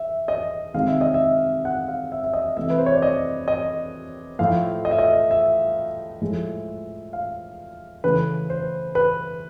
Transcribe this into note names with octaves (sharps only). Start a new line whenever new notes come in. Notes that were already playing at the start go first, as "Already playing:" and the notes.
Already playing: E5
D#5
C3 D#3 G#3 F5
E5
D#5
E5
F#5
F5
E5
E5
D#5
C3 E3 A3 E5
B4
C5
C#5
D5
D#5
D#5
A2 F3 A3 F5
D#5
E5
D#5
E5
A2 F3 G#3
F5
C#3 E3 A3 B4
C5
B4